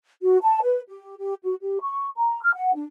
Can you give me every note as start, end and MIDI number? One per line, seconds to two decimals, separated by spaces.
0.22 0.37 66
0.41 0.59 81
0.62 0.81 71
0.89 1.16 67
1.18 1.34 67
1.43 1.54 66
1.61 1.78 67
1.81 2.08 85
2.16 2.41 82
2.42 2.51 89
2.55 2.72 78
2.75 2.84 62